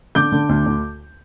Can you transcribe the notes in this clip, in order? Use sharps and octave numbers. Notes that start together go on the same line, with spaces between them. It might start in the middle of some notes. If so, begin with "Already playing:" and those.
D3 D6 G6
D3
D2
D2